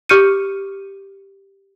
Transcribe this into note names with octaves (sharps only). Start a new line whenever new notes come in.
G4 C#6 F6 G6 C#7 D#7